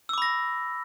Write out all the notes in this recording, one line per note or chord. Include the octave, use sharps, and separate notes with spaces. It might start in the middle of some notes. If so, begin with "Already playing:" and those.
B5 D6 E6 A#6